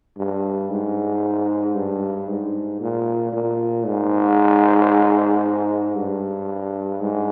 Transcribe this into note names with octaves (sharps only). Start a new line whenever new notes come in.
G2
G#2
G2
G#2
A#2
A#2
G#2
G2
G#2